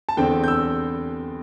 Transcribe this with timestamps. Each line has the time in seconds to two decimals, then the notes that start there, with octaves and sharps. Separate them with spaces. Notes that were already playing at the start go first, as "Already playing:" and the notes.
0.09 A5
0.17 E2 D3 C4 G5
0.44 G6
0.48 E6